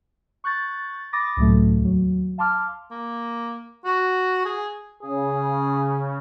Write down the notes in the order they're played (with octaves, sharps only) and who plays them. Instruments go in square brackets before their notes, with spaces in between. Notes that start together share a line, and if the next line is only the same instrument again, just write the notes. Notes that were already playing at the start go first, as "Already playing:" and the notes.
[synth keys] C#6 F#6 G6 A6
B5 D6 D#6 A6 A#6
C#2 A2 C3 F#3 A3
D#2 F#3
F5 A5 C6 D6 F6
[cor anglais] A#3
F#4
G#4
[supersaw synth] C#3 [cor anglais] G#4